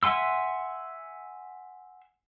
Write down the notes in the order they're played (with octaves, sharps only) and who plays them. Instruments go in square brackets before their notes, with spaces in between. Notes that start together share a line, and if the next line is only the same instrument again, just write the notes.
[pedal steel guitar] E5 F#5 G#5 C6 E6